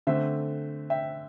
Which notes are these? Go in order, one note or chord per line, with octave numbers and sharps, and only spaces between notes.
D3 A3 C4 C5 E5
E5 G5